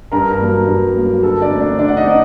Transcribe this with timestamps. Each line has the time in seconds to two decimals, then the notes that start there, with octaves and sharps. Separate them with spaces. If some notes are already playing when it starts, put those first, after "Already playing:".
0.12 G2 A#4 A#5
0.40 F#3 A#3
0.67 G2
0.95 F#3 A#3
1.23 D3 A4 A5
1.42 D4 D5
1.51 A3 C4
1.60 D4 D5
1.79 D3 D4 D5
1.88 F#5
1.97 D#4 D#5
2.07 C4 D5